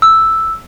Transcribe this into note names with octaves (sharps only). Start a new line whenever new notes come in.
E6